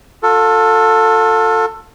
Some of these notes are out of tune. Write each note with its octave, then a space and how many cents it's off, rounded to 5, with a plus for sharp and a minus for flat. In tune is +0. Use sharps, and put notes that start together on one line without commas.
F4 +40 A4 +15